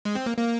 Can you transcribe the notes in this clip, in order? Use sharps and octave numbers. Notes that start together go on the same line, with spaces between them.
G#3
C4
A#3
A#3